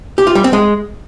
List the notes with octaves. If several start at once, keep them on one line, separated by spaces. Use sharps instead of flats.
G4
F4
G3
C4
G#3